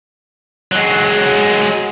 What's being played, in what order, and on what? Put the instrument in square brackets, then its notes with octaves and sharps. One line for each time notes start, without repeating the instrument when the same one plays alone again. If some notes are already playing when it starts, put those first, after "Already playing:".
[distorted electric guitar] F#3 G#3